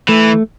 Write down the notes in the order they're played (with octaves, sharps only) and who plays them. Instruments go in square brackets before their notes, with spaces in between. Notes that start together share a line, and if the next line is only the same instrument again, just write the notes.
[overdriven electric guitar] E3 [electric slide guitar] A3